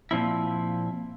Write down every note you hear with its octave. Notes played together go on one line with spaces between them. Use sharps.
A#2 F3 C4 E4